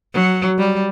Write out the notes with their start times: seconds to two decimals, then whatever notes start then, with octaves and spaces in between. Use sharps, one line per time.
0.14 F#3
0.58 G3